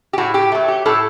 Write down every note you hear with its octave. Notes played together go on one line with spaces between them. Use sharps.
G4
A2 F#4
G4
F#3 A3
G4
A2 A4